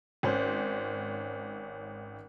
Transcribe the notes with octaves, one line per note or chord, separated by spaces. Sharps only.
G#1 C#4 C5